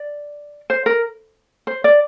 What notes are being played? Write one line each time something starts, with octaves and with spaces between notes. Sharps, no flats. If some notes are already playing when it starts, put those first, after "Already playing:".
Already playing: D5
C5
A#4
C5
D5